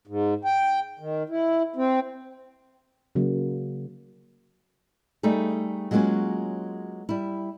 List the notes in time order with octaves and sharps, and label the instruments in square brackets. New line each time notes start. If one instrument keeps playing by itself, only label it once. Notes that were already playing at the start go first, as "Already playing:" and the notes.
[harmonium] G#2
G5
D#3
E4
C4
[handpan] C#3 F#3 A#3
[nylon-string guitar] G3 A3 D#4 G#4
F#3 G#3 A#3 C#4 F4 F#4
G3 E4